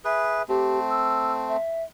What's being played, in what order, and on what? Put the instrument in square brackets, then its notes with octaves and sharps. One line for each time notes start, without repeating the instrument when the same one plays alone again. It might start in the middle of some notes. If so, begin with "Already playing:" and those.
[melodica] G#4 B4 [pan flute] E5
[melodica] A3 C4 [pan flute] G4
[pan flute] E6
E5